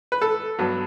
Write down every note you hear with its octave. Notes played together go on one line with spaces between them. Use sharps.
B4
A4
G2 F#3 B3